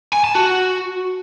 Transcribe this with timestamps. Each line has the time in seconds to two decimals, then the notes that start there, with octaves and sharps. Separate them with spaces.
0.13 G#5
0.24 A5
0.35 F#4